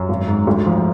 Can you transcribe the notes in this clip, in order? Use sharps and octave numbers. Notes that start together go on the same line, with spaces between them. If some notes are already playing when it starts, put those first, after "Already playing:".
Already playing: F#2
G#1
G#2
D2
F3